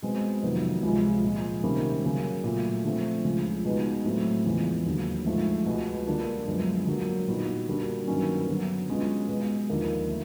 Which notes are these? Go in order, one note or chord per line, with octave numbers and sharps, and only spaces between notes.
B2 G#3 C4
F2 C3 D#3 F#3 B3
C#2 C3 F3 G#3
A#2 F3 G#3
C3 D#3 G3 A#3 C#4
C#3 F#3 A#3
A#2 F#3 A3
D3 F3 A3 C4
C#2 C#3 F3
B2 G#3 B3 D#4
A2 F#3 A3 C4
E2 C#3 F3 G#3
D#2 D3 F#3
G#2 F3 A3
C#2 B2 G#3 B3
D3 G3 A#3 D4 F4
F#2 D3 F3 G#3 B3
D3 F#3 A#3
A#2 G3 B3 D#4 F#4
D3 G3 A#3 D4 F#4
G2 D#3 F#3 A#3 C#4
D3 F#3 B3
B2 G#3 C#4 F4
B2 G#3 B3
D#2 D3 F3 A#3 D#4
A3